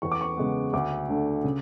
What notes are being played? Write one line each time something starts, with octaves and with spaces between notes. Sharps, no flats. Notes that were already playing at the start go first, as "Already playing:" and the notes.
E2 C#6
D6
C#6
C#3 G#3 B3
D2 D6
D3 A3 D4
C#3